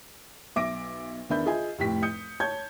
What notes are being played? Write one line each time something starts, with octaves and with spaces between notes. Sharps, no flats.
B1 E5 D6 A#6 D7
E2 D#3 D4 E5 B5 G6
F4 G#4 D#5 E5 G#5
F1 A2 G4 B6
D#6 G6 C#7
C#5 A5 G6 G#6